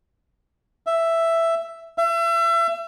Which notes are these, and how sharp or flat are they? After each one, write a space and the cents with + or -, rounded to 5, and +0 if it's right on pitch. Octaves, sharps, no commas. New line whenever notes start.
E5 +5
E5 +35